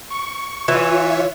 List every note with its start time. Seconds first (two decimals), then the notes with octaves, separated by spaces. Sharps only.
0.10 C#6
0.68 E3 F4 C#5 E5